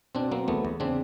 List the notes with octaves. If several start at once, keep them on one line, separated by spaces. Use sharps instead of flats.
B2 C4 D4
F#3 A#3 C4
E2 A3 B3
E2
C#3 C4 D4